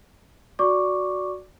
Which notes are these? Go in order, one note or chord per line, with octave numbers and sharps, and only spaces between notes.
F#4 D5 C#6 D6